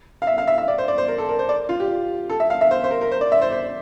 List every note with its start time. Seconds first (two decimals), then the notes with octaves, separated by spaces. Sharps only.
0.22 F5
0.27 E5
0.38 F5
0.47 E5
0.58 E5
0.68 D5
0.78 C5
0.88 D5
0.98 C5
1.08 A#4
1.18 A4
1.29 A#4
1.39 C5
1.49 D5
1.69 F4
1.80 G4
2.30 A4
2.40 E5
2.50 F5
2.61 E5
2.71 C5
2.84 C5
2.91 A#4
3.01 A#4
3.12 C5
3.21 D5
3.32 E5
3.42 C5
3.52 C5